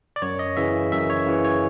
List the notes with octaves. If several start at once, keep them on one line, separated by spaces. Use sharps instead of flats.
D5
F#2 C#5
D#5
C#3 E3 E5
F#2 E5
C#5
C#3 E3
C#5